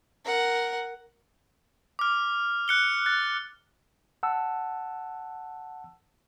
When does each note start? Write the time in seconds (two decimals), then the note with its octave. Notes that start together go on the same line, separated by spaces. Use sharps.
0.25 A#4 F#5
1.99 D6 F6
2.68 F#6 C#7 G7
3.06 F#6 A6
4.23 F#5 A5 E6